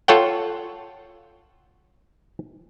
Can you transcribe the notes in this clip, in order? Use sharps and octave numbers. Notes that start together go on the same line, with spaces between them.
F4 A4 C#5 F#5 G5